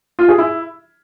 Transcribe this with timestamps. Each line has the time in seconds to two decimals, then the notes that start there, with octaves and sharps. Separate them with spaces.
0.19 F4
0.28 G#4
0.38 E4